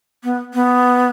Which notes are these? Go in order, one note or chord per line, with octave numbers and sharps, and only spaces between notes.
B3
B3